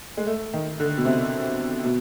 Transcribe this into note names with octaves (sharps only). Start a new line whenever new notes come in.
G#3
A3
D#3
D3
B2
C3
B2